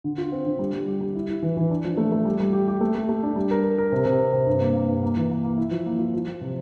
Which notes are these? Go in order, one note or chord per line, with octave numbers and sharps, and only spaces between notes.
D3
F4
C4
D3
G3
G3
G4
G3
E4
E4
E3
E3
D4
F3
A3
A3
G3
G3
G4
G4
A3
A3
A3
D4
G3
A#4
A#4
A#4
C3
C3
C4
C3
G2
A#3
A#3
G2
A#3
E3
A#3
A#3
E4
F3
A#3
F3
F3
F3
C3